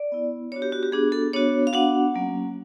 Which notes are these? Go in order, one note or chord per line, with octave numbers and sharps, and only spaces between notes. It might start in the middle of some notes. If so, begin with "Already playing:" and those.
Already playing: D5
B3 E4
B3 D4 F#4 C#5
G4
F#4
G4
B3 D4 F#4 G#4
A4
B3 D4 F#4 C#5
F5
B3 D4 F#4 F#5
F#3 A#3 C#4